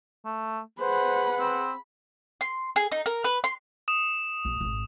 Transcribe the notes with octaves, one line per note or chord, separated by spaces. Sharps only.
A3
G#4 B4 C5 F#5 B5
C4
C6
G#4
D#4
A#4
B4
C6
D#6 E7
A#1
D1 G#1